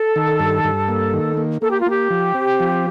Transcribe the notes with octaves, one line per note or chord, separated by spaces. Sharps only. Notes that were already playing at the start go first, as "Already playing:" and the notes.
Already playing: A4
D#3
G2
G2
A#3
D#3
A#3
A#3 A4
G4
F4
A#3 G4
F3
C4
F3